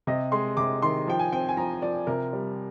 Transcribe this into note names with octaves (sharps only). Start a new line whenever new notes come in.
C3 D#5
G#3 C6
C3 D6
D#3 C6
F3 G5
G#5
C4 G5
G#5
F3 A#5
F3 D5
C3 A#4
G3